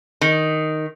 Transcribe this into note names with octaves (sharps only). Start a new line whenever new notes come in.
D#3